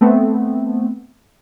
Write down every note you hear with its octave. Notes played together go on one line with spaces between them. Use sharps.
A3 B3 C4